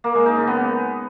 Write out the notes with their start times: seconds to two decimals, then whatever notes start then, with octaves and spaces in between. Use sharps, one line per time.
0.04 A#3
0.15 G#3
0.26 D#4
0.37 C#3
0.47 B3